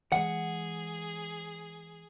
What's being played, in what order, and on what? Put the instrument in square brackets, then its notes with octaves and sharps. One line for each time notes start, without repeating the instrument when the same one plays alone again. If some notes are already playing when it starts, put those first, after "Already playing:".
[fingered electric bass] E3 G#3 [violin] G#4 [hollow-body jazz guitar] F#5